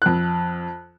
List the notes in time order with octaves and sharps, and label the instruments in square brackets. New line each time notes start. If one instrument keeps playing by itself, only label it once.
[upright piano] F2 F#6